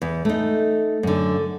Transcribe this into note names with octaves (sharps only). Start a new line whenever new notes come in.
E2
A3 D#4
F#2 D3